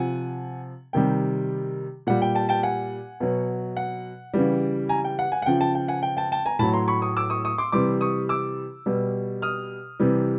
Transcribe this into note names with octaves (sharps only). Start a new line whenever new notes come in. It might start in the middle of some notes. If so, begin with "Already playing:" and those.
Already playing: C3 F3 F#5 G#5
C3 D#3 G3 G5
A#2 G3 F#5
G5
G5 A5
G5 A5
F#5 G#5
B2 F#3
F#5
C#3 E3 G3
G#5 A#5
G5
F#5
F#5 G#5
F#5
C#3 F3 G5
G5 A5
G5
F#5 G#5
G5
G5 A5
G5 A5
G#5 A#5
A2 F#3 A5 B5
A#5 C6
B5 C#6
C#6 D#6
D6 E6
C#6 D#6
C#6 D#6
C6 D6
C3 E3 G3 C6 D6
C#6 D#6
D6 E6
B2 G3
D#6 F6
C3 E3 G3